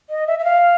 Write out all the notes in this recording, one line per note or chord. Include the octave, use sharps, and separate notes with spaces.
D#5
E5
E5
F5